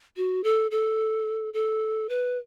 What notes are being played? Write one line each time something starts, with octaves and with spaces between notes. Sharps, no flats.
F#4
A4
A4
A4
B4